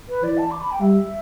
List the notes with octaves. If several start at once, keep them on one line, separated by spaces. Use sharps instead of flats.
B4
E3 D5
A5
D6
B5
G5
G3 E5